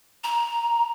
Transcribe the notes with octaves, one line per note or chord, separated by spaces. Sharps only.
A#5